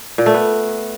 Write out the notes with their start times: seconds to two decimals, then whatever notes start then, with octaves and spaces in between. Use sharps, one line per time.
0.18 A#2
0.26 A3
0.34 B3